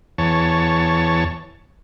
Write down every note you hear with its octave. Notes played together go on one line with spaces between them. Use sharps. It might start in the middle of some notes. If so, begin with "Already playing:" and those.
E2 C#5 A5